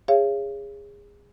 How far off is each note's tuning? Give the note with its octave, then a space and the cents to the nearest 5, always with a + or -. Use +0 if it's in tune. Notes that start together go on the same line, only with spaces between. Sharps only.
G#4 -25 C#5 +0 F5 -40